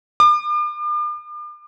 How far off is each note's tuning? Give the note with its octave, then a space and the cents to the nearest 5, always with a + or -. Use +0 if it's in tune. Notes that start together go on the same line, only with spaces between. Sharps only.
D6 +40